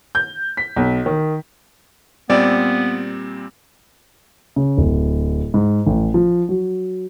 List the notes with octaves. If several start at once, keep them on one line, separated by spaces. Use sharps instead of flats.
G6
B6
B1
D#3
A#2 G3 B3 C4 D5
C#3
D1
G#2
A1
F3
F#3